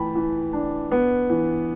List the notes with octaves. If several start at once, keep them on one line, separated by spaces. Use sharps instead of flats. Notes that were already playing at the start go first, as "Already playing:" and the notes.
Already playing: E3 A3 G5 A5 B5
E3
D4
B3
E3